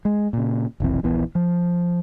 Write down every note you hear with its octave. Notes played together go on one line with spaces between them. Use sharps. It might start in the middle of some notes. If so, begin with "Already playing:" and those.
G#3
A#2 C#3
F1 B1 E3 C4
D#1 A#1 E3 B3
F3